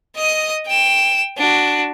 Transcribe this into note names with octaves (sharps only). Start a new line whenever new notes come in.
D#5 D#6
G5 E7
D4 F#4